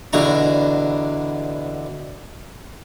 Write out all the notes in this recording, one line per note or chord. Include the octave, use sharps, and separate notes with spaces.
E2 B2 D3 D4 A#5 C#6